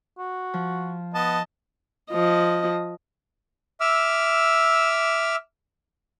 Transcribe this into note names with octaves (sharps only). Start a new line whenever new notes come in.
F#4
F3
B3 D#5 A5
F3 D#5
E5 D6 E6 F6